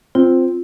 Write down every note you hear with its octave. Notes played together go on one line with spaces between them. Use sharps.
C4 F4